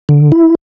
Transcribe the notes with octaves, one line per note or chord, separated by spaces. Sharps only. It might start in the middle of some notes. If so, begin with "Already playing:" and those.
D3
E4